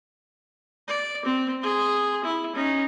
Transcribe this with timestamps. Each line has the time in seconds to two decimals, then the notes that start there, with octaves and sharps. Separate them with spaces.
0.88 D5
1.25 C4
1.62 G#4 C6
2.24 E4
2.56 C#4 D#4